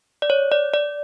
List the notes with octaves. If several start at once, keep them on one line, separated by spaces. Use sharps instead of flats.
D5
C#5
D5
D5